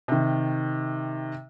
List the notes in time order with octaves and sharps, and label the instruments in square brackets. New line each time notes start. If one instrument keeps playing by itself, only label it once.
[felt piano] C3 D#3